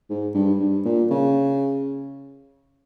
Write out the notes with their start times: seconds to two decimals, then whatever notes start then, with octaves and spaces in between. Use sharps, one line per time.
0.10 G#2
0.34 G2
0.60 G2
0.85 A#2
1.10 C#3